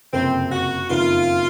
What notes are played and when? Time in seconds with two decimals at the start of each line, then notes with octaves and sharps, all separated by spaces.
0.13 F#1 F2 C3 C4
0.52 F#4
0.90 F#1 F2 D#3 F4